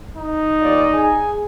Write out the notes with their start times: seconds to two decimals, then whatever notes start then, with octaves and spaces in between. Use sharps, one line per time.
0.17 D#4
0.62 D#2 F4 D5
0.94 G#4 G#5